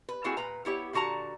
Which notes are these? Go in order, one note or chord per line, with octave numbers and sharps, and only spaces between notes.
B4
A3 A#3 C4 E4 F#4 G#4
A#2 B4 A#5
B3 E4 G4 C#5
A#2 D3 F#4 A5 A#5